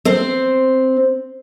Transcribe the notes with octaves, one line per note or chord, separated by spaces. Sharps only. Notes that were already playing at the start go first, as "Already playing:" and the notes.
C4 C5